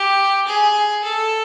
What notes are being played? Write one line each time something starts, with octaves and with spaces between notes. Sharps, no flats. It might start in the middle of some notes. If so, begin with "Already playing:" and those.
Already playing: G4
G#4
A4